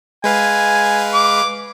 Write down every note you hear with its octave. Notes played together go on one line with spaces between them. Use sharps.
G#3 B4 F5 G#5
D6